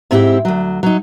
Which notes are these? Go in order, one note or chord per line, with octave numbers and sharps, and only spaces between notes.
G#2 C4 E4 F#4 G4
D2 F#3
F#3 D#4